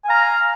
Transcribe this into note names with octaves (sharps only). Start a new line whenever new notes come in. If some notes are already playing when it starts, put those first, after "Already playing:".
F5 G#5 A#5 F6